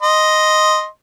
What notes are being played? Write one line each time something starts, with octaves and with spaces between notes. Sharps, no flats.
D#5 C6